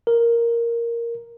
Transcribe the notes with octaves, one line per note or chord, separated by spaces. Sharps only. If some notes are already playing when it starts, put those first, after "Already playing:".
A#4